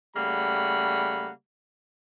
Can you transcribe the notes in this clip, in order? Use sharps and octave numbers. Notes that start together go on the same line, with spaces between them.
C#3 G3 A3 A#3 F#5 B5